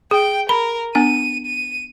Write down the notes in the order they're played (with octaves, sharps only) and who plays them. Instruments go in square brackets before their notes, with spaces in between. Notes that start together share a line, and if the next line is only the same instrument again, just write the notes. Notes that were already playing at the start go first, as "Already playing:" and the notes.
[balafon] G#4 [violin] G5
[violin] A#4 [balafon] B5
[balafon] B3 D4 G#5 [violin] D#7
[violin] D#7